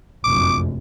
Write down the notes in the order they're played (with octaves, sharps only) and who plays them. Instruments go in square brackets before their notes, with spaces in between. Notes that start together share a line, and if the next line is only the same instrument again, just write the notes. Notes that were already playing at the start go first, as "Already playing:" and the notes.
[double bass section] F1 A#1 F#2 [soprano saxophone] D6